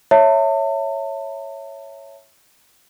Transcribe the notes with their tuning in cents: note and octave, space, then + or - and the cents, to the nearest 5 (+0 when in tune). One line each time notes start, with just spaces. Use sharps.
C#5 +0 E5 +0 A5 +40